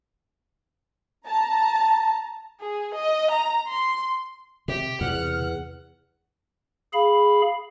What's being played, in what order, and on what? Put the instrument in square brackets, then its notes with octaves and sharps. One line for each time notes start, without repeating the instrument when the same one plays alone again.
[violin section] A5 A#5
[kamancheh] G#4
D#5
A#5
C6
[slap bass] C3 [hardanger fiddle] G4
[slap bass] E2 [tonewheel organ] C3 F6 [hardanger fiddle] F#5
[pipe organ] G#4 F5 B5